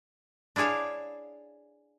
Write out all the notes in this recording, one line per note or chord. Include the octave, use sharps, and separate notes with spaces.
D4 E4 G#4 C#5 F5